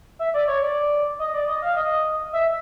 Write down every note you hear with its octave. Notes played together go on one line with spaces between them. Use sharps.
E5
D5
C#5
D5
D#5
D5
D#5
F5
D#5
E5